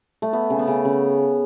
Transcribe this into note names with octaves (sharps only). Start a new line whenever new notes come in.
A3
A3 B3
C#3
B3
C#3
C#3